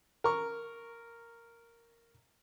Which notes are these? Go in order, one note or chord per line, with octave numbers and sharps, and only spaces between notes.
A#4 C#6